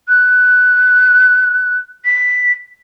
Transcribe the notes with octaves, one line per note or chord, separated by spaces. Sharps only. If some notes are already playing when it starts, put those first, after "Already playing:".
F#6
B6